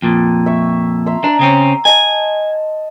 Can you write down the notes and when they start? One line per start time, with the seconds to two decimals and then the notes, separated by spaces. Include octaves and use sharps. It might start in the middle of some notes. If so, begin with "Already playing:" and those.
0.02 F2 A#2
0.46 E5 C#6
1.06 E5 A#5 C6
1.24 D4 A#5 C6
1.39 C#3 C4 C#4
1.85 D#5 G#5 A5